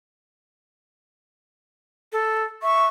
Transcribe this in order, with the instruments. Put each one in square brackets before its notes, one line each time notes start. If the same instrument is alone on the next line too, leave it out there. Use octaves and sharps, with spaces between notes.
[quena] A4
[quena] E5 [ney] C#6